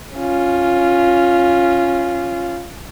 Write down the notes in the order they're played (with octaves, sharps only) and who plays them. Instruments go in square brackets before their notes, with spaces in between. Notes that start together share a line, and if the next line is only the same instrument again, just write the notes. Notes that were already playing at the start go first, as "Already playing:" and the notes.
[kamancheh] C#4 F4